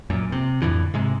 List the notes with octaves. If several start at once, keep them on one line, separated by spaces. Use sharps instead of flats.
F#2 A#2
C3
F2 A2 D3 E3
G#2 C3 G#3